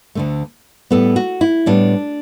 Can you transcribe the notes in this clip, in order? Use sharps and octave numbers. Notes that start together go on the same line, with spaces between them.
D2 D3 A3
A2 G3 B3 A4
F#4
E4
A2 G3 B3 D4